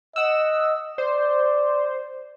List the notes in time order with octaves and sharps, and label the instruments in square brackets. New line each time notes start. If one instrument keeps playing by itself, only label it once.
[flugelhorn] D#5 [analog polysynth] F#5 E6
[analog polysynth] C5 [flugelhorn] D5